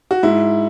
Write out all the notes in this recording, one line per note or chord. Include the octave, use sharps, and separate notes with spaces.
F#4
G#2 E4